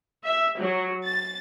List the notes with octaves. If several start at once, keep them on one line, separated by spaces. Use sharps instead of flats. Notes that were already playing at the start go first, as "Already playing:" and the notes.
E5
F#3
A6